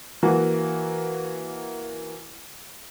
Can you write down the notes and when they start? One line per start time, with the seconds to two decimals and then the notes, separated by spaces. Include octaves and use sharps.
0.23 E3 A#3 F#4